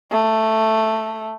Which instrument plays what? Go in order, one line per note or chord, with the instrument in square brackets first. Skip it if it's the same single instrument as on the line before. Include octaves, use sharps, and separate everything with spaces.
[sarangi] A3